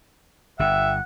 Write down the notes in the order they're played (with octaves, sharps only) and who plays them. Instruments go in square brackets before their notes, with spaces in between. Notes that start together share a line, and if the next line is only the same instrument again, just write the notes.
[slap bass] G1 G2 [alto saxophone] E5 [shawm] F#5 [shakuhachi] G5